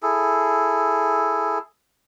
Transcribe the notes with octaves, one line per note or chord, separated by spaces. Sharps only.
E4 G#4 A4